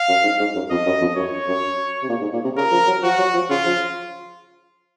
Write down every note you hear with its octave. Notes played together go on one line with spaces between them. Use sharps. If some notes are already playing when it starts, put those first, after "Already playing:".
Already playing: F5
F#2
G#2
G#2
F#2
F2 D#5
F#2
F2
F#2 C#5
F#2
C3
A#2
G#2
A#2
C3
C#3 A#4
F3
F#3
F3 F#4
F#3
F3
C#3 F4
F3